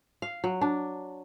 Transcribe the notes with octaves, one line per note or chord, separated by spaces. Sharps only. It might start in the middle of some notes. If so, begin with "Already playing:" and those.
F5
F#3
D4